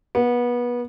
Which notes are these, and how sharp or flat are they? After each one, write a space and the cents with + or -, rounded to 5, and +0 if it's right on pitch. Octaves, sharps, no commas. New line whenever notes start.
B3 -25